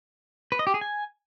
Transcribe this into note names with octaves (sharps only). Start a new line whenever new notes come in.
B4
D#5
G4
G#4
G#5